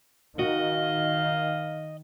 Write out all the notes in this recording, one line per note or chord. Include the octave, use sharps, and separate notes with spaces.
D#3 F#4 D#5 F5